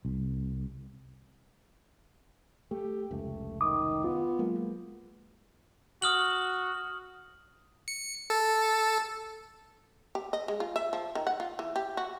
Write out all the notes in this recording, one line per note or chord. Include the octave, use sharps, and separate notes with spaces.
C2
A3 G4
F1 C#2 A3
D#3 D6 D#6
B3 F4
F#3 G#3 A#3
F#4 D#6 F6 F#7
C#7
A4
G4
D#5
G#3
F4
E5
F3
D#3
F#5
F4
E3
G4
F#4